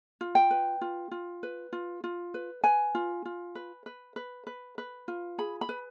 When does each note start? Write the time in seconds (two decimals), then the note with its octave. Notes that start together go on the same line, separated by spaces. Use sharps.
0.21 F4
0.35 G5
0.51 B4
0.81 F4
1.11 F4
1.43 B4
1.73 F4
2.04 F4
2.34 B4
2.64 B4 G#5
2.95 F4
3.25 F4
3.55 B4
3.86 B4
4.16 B4
4.47 B4
4.78 B4
5.08 F4
5.38 G#4 B5
5.61 B5
5.69 B4